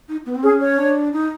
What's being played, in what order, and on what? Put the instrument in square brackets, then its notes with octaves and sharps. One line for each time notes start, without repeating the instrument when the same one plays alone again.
[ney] D#4
B3
C4
[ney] C#4 [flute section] G#4
[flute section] C#5
[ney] D4
D#4